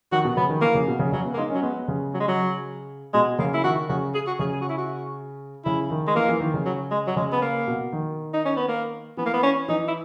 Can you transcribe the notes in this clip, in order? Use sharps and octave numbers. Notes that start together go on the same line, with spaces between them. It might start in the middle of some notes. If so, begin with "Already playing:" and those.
D#3 F#4
B2
C#3 B3
D#3
E3 A#3
C#3
B2
C#3
C#3 F#3
B3
A#3
G#3 D#4
F#3 C#4
G#3 B3
C#3
F#3
G#3
F#3
B2 G#3
C#3 A#3
E4
D#3 F#4
C#3 F#4
G#4
F#4
C#3 G#4
G#4
F#4
E4
F#4
C#3 E4
D#3
G#3
E3 A#3
E3
D#3
C#3
F#3
G#3
F#3
C#3 G#3
B3
A#3
B2
D#3
D#4
C#4
B3
A#3
E3 B3
A#3
B3
C#4
E3 D#4
E4